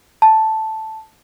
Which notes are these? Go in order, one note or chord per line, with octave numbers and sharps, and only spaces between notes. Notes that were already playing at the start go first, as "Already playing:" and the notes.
A5